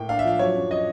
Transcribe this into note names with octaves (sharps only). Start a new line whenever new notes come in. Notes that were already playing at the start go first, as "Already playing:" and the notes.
Already playing: A2 A#3 G5
D4 F5
E5
F3 F5
F#3 C#5
F#2
D#5